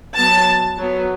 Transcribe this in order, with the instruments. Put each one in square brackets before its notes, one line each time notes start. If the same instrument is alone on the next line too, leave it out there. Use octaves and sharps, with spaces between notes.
[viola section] F#3 B3 A5
F#3 B3